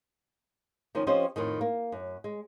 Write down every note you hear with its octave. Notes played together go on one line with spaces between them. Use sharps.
D#3 F3 C#4
F3 C4 C#4 G4 C5 D#5
F2 A2 D#3
A#3
F#2
G#3